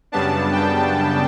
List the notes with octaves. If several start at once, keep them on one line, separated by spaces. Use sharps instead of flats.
F#2 C#3 G3 B3 D4 A5
G5